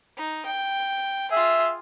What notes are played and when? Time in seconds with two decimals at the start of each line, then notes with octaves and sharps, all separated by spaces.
0.17 D#4
0.46 G5
1.32 F4 G#4 E5